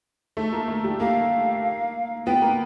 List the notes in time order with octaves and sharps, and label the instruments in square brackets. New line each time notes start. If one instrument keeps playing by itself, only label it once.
[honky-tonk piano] A3
A#3
A3
G3
[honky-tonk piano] A#3 [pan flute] F5
[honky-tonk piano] B3 [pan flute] G5
[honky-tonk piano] A#3